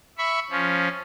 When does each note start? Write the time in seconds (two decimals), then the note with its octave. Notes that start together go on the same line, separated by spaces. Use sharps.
0.18 E5 B5 C#6
0.50 F3 C#4